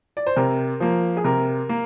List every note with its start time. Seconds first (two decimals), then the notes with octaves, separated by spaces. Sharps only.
0.17 D5
0.27 C5
0.37 C3 A#4
0.80 F3 A#3
1.17 G#4
1.24 C3 A#4
1.69 A#3